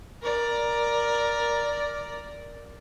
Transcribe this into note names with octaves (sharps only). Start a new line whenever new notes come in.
A#4 D5